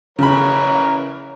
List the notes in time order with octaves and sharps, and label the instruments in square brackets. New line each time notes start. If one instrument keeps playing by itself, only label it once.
[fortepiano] C#3 B5 [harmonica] E3 A#4 C#5